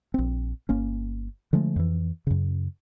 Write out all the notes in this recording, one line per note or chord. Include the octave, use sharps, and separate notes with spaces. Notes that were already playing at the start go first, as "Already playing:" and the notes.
A#1 C4
G1 A#3 C#4
D3 F3 G#3 A3
F2 E3
F#2 C#3